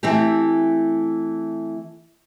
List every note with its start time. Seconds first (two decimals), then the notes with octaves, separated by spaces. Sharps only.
0.03 E3 A3 C4 E4 G4